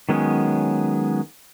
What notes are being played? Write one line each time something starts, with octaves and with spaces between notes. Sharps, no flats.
D#3 F#3 G#3 B3 C#4